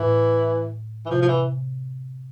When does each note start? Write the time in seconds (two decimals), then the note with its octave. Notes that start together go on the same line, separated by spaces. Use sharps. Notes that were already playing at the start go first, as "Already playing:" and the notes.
Already playing: A2 E3
1.06 E3
1.10 C3 F3
1.22 F3
1.28 E3